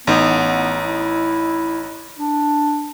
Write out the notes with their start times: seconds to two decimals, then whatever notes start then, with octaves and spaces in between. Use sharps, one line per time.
0.07 A1 B3 D#4
0.83 E4
2.18 D4